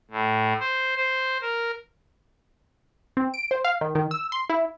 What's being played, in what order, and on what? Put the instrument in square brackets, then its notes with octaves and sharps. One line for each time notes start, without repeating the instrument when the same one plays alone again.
[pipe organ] A2
C5
C5
A#4
[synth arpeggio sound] C4
D7
C5
F5
D#3
D#3
E6
C6
E4